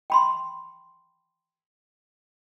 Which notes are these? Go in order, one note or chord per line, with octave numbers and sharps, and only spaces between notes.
G5 B5 C6